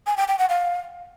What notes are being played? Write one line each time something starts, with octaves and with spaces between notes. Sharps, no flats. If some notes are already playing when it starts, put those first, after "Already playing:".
G#5
G5
G5
F#5
F5